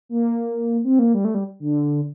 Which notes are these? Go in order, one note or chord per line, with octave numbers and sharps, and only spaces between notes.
A#3
C4
A#3
G3
A3
G3
D3